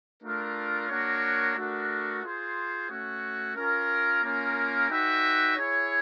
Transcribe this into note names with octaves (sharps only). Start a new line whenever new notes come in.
A3 D4 F4 A#4
A#3 D4 F#4 A#4 C#5
A3 D4 F#4 A#4
F4 G#4 C5
A3 C#4 F#4
C#4 F4 A#4
A#3 C#4 F4 A#4
D#4 F#4 B4 E5 G5
E4 G#4 C#5